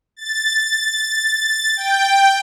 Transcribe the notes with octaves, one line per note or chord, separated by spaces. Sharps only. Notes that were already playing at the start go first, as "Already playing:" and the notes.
A6
G5